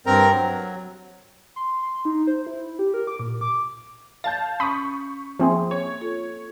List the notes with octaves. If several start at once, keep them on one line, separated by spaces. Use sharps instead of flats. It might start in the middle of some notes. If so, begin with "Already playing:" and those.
G2 C4 A#4 A#5
F#3
C6
C6
D#4
C5
E4
G4
A#4
D6
A#2
D6
F5 A5 G6 A6
C#4 B5 C#6 D#6 B6
F3 A#3 C4 G#4 E5 C6
C#5
F4 A4